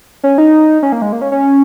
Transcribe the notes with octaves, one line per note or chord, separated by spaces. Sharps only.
C#4
D#4
C#4
A#3
G#3
A#3
C#4
C#4